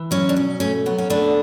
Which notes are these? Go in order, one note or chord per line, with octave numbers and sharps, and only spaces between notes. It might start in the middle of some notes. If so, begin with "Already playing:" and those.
Already playing: E3
F#3 C#4
D4
B2 C#4
A3 C#4
F#3 B3
C#4
A3 B3 D4